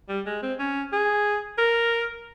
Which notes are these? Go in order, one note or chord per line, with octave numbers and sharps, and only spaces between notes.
G3
G#3
C4
C#4
G#4
A#4